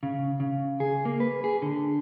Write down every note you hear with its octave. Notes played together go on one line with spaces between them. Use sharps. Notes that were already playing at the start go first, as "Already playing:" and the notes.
C#3
C#3
G#4
A#3
B4
G#4
D3